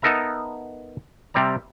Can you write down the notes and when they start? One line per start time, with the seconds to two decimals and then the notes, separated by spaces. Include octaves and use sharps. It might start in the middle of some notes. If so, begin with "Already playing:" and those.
0.02 B3 D#4 A4 A#4 E5 A#5
1.34 C3 G3 C4 D5 A#5